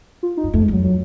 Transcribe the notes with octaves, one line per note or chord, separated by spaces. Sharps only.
F4
D#4
F#2
F2 A3
G#3
F2 F#3
F#3